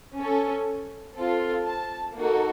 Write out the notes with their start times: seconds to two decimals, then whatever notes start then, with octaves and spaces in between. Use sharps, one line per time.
0.17 C#4 A4
1.16 C4 F4 A4
1.66 A5
2.16 A#3 D#4 F#4 A4